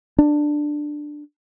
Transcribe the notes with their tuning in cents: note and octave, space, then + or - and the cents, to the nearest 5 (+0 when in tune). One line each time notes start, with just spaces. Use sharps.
D4 +10